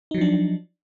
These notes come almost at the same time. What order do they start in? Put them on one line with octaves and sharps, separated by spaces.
D#4 F#3 F3 D4